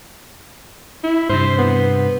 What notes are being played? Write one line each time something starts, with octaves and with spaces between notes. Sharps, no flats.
E4
G2 C3 C5
B3